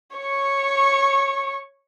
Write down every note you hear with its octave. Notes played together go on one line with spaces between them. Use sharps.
C#5 C#6